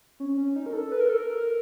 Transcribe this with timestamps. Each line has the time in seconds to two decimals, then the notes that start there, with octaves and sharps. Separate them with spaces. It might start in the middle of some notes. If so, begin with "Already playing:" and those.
0.20 C#4
0.37 C#4
0.56 D#4
0.66 A#4
0.73 A4
0.92 B4
1.00 A#4
1.10 A4
1.18 A#4